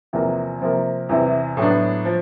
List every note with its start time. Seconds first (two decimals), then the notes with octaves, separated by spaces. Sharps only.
0.13 E2 C3 F3 A#3
0.61 C3 F3 A#3
1.09 E2 C3 E3
1.57 A2 F#3 B3 D4
2.05 F3